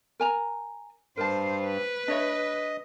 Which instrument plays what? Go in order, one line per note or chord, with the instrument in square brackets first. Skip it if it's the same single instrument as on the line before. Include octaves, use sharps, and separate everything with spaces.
[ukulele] A#4 G#5 A#5
[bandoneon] G2 [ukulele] A#4 A5 [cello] C5
[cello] B4
[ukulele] D4 C#5 E5 [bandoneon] D#5